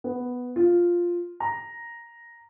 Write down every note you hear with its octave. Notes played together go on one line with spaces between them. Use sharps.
B3
F4
A#5